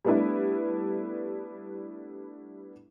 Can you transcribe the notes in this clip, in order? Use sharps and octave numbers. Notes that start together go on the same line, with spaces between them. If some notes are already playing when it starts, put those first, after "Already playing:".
G3 A3 B3 D4 E4 B4